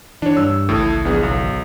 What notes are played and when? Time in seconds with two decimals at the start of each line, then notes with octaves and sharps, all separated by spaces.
0.22 E3 D4 C#5
0.37 G2 E6
0.69 G#1 C#2 A2 E3 A4
1.05 A#1 B3 G#4
1.23 B1